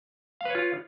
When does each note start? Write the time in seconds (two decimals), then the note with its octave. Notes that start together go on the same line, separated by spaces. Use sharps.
0.41 F5
0.45 B4
0.50 C#5
0.55 F4